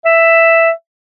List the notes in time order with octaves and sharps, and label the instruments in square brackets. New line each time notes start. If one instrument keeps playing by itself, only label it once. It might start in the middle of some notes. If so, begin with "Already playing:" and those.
[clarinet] E5